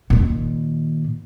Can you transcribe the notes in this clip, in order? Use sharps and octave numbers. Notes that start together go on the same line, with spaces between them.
A#2 D#3